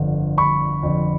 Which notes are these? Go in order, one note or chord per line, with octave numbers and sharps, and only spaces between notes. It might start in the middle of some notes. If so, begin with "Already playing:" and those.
Already playing: G1 F2 D3
G1 B5 C#6
F2 D3